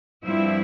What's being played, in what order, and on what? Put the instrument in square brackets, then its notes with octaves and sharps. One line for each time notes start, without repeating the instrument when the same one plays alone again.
[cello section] G2 F3 C4 E4 E5